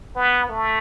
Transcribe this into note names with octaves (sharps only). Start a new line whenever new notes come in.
B3
A3